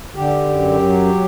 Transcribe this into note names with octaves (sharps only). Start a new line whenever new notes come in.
D3 G4
F#2
F#3